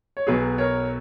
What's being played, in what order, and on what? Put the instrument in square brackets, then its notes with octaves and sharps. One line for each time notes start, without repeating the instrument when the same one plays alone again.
[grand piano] C#5
B1 B2 F#3 G#4 B4
A#4 C#5